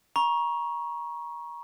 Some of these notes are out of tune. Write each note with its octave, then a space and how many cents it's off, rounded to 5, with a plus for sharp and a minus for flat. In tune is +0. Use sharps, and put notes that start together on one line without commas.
A#5 +30 C#6 +0